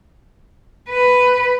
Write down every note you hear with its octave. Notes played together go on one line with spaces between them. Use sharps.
B4